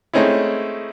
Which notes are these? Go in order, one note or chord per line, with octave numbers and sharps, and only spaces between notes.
G#3 A3 C4 C#4 D#4 E4